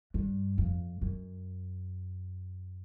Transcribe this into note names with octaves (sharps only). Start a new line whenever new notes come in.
G2
F2
F#2